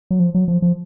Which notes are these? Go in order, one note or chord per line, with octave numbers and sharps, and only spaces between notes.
F#3
F3
F#3
F3
F3